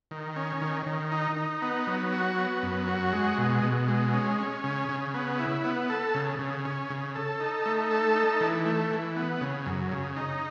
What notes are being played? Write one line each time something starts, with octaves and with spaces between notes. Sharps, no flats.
D#3
C#4
D#3
D#3
D#4
D#4
B3
F#3
F#4
B3
F#2
F#4
G#3
B2
B2
G#3
C#4
C#4
C#3
C#3
B3
E4
B3
A4
C#3
C#3
C#4
C#3
A4
D#4
A3
A4
D#4
E3
A3
E3
B3
C#3
F#2
C#3
D#4